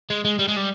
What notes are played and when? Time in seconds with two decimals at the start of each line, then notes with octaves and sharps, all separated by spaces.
0.10 G#3
0.25 G#3
0.39 G3
0.48 G#3
0.57 G3